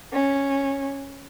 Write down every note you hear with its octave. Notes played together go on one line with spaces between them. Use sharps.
C#4